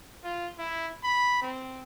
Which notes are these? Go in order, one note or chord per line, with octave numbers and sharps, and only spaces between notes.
F4
E4
B5
C4